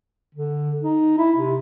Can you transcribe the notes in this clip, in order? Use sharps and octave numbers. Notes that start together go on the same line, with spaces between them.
D3
D#4
E4
C3